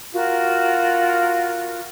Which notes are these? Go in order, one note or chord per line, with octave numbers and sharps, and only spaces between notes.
F4 F#4 A#4